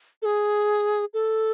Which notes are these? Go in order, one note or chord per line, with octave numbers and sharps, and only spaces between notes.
A4
G#4
A4